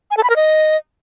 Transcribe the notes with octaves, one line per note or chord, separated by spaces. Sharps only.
G#5
A4
B5
A#4
D#5